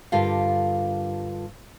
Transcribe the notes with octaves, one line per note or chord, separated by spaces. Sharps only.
G2 D3 F4 G4 A#4 F5